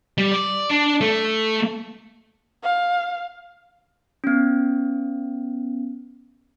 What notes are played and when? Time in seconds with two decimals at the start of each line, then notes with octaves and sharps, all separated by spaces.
0.18 G3
0.31 D5
0.70 D4
1.01 A3
2.63 F5
4.24 B3 C#4